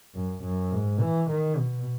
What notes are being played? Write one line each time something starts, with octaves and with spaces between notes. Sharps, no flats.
F#2
F#2
G#2
E3
D#3
B2